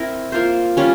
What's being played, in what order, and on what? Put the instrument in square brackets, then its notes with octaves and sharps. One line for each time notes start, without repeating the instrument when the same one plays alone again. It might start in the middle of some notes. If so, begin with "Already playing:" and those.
Already playing: [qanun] C4 E4 A#4
A#3 F4 C5
G3 C#4 F4